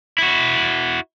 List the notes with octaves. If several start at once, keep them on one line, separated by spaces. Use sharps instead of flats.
E4 F#4